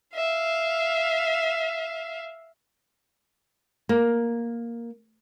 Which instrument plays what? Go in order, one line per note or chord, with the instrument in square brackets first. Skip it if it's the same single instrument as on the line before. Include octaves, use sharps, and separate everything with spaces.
[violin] E5 F5
[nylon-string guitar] A#3